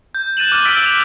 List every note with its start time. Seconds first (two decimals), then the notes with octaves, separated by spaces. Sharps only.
0.15 G6
0.37 F#6 A6 D#7 E7 F#7
0.52 D6 F6 F#6
0.65 E6 A6 B6 D7 F#7 G7
0.86 F7